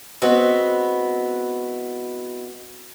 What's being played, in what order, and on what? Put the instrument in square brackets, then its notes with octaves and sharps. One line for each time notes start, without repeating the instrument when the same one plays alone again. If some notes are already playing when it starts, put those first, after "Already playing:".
[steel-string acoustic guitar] G#3 B3 C4 E4 F#4